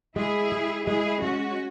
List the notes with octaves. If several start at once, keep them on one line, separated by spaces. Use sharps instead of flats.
G#3 E4 G#4
G#3
G#3 E4 G#4
G#3 C#4 F#4